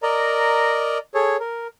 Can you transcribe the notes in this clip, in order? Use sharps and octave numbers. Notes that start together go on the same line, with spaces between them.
A#4 D5 D#5 A#5
G#4 A4 C#5
A#4